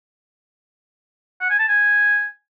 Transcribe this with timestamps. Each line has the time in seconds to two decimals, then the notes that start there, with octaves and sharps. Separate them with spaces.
1.41 F#5
1.50 G#5
1.59 A5
1.68 G#5